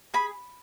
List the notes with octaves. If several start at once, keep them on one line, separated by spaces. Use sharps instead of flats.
G#4 B5